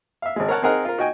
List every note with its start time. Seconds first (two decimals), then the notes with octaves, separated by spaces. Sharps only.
0.22 E5 F5
0.36 G#1 G#3
0.49 A#4 C#5 F#5 A5
0.62 C4 D#4 G#4 A#4 F#5
0.85 F4 A#4
0.98 D#4 F#4 D#5 G5 G#5